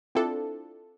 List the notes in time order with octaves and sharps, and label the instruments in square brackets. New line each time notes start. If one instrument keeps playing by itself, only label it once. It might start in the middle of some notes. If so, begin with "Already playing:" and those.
[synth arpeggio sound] C4 D4 E4 F4 A4